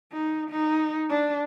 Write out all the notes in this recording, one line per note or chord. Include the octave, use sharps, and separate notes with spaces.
D#4
D#4
D4